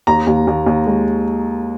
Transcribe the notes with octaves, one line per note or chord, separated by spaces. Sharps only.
D#2 A#5
D#2
D#2
D#2
G#3